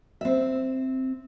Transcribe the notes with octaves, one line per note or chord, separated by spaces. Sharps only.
C4 E5